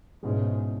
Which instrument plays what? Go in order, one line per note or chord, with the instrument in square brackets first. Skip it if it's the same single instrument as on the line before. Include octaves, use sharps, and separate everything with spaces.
[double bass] G#2 [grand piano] B2 G#3 C#4 E4